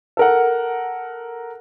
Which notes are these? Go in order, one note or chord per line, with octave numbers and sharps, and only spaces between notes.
A4 A#4 F#5